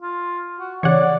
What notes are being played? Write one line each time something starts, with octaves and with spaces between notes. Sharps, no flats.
F4
F#4
C#3 E3 C#5 D5 F#5